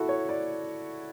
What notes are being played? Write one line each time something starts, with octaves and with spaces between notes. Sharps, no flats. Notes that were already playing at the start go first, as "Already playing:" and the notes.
Already playing: E4 F#4 A4
C#5
D5